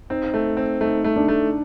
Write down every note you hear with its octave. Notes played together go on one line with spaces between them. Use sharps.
C4 D#4
A3
C4
A3 D#4
A3
D4
A3